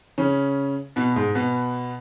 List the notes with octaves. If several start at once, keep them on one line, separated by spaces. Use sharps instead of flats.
C#3 C#4
B2 B3
G#2 G#3
B2 B3